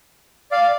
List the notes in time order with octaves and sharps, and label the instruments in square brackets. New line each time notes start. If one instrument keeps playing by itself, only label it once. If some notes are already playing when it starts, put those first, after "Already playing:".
[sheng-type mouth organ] D5 F5